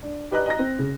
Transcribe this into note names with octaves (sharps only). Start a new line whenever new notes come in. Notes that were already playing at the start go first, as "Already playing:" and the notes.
D4
G4 B4 D5 D#5 A#5 F#6
D#5 A#5 A#6
C4
C#3